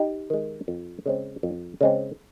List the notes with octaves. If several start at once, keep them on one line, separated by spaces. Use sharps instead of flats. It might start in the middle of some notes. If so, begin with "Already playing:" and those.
Already playing: D#4 G4
D#3 G#3
F2
C#3 G#3 C4
F2
C#3 G#3 C4